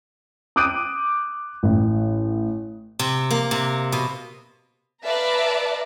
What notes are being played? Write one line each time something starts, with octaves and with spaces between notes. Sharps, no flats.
D6 D#6 F#6 G6 D7 D#7
A1
C3
A#3
C3
B2
B4 D5 E5 F5 A5 A#5